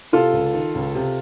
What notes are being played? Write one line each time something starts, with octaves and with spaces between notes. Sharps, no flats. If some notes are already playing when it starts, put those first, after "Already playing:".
C3 F4 A4
C#2
D#3
C#2
C3